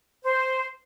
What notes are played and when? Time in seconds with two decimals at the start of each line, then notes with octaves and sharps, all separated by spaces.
0.24 C5